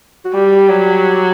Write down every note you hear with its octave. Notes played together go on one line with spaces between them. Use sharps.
F#4
G3 G4
F#3